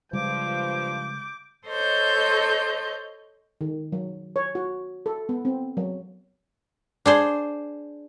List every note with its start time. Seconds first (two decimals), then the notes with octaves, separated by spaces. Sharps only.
0.13 G2 C#3 F3 G3 G#3 D6 G6
1.67 A4 C5 C#5 D#5 G6
3.61 D#3
3.92 F#3
4.36 C#5
4.55 F#4
5.06 A4
5.29 B3
5.45 C4
5.77 F#3
7.06 D4 G#4 C5